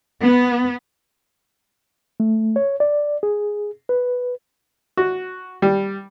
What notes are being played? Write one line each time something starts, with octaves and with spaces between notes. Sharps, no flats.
B3
A3
C#5
D5
G#4
B4
F#4
G3